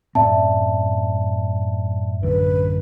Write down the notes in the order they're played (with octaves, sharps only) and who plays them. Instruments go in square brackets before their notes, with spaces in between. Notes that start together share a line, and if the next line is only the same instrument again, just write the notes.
[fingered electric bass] F#2 A2 C4 [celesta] D5 E5 A5
[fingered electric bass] A1 F#2 D3 [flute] B4